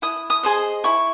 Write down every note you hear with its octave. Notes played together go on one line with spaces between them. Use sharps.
E4 D#6
D#6
G#4 C5 D#5
E4 C#6